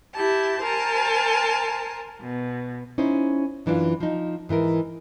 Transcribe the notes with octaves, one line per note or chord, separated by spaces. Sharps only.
E4 G4 A5
A#4 C5 G#5 A5
B2
C#4 D#4 E4 C5
F#2 E3 D4 E4 F4
F3 D#4
G#2 E3 E4 A#4